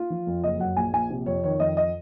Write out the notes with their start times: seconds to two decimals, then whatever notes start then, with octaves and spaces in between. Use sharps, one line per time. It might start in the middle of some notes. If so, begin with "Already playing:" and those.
Already playing: F4
0.10 F3
0.27 F2
0.44 F#1 D#5
0.60 F#2 F#5
0.76 A#1 G#5
0.93 A#1 G#5
1.10 C3
1.26 F2 C#5
1.44 D#3 C#5
1.60 F2 D#5
1.77 D#5